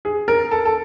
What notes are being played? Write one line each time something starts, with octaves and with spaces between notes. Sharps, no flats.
G#4
A#4
A4
A4